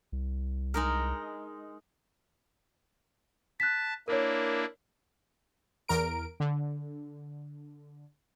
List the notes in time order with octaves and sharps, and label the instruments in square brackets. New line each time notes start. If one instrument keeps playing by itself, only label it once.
[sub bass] C2
[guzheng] G#3 D#4 A#4
[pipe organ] A5 [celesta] F#6 B6
[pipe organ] A#3 D4 E4 [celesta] A#4 C#5
[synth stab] E2 A#4 D7
D3